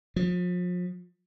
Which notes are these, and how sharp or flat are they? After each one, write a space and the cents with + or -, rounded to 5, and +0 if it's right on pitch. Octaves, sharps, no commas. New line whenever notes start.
F3 +40